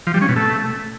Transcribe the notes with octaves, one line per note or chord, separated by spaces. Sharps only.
F3
G3
C#4
B2
A3